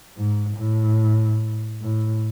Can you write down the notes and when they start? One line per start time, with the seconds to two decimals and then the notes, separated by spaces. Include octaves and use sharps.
0.17 G#2
0.58 A2
1.82 A2